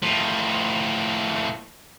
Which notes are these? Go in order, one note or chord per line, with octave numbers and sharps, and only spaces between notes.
A2 F3